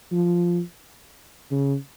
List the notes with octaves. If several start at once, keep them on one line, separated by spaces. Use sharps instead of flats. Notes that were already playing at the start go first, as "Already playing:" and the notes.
F3
C#3